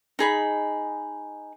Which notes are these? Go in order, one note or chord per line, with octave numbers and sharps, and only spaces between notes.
D#4 G#4 B5